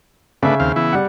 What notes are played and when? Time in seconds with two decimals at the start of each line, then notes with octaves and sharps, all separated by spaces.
0.43 C#3 A3 D4 B4 E5
0.60 D#2 C4 F5
0.76 E3 B3 E4
0.93 G3 F#5